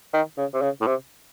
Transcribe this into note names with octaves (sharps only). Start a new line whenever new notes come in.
D#3
C#3
C3
C#3
A2
C3